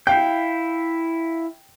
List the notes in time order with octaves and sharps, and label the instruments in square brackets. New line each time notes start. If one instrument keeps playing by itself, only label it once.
[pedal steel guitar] E4 F5 G6 [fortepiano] G5